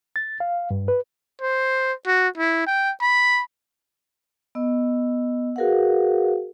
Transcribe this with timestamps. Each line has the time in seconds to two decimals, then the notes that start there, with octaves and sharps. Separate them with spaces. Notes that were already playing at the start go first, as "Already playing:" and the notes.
0.16 A6
0.40 F5
0.71 G2
0.88 B4
1.42 C5
2.07 F#4
2.38 E4
2.67 G5
3.01 B5
4.55 B3 D#5 E6
5.56 F#4 G#4 A#4 B4 F5 F#5